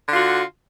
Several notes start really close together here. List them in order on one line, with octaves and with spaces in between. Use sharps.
D3 F4 F#4